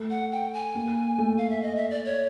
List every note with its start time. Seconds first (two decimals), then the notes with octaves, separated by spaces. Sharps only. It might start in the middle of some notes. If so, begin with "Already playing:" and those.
Already playing: A3
0.10 F#5
0.32 G5
0.54 G#5
0.75 A#3
1.18 A3
1.38 F5
1.50 E5
1.62 D#5
1.76 E5
1.91 D5
2.05 C#5